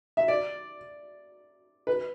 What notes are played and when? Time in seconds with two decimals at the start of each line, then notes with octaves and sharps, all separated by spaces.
0.17 E5
0.28 D5
1.87 B4